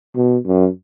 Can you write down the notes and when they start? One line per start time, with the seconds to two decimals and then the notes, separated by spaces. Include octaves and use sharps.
0.16 B2
0.46 F#2